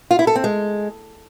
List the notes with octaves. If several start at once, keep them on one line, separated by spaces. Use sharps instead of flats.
F4
E4
A4
C4
G#3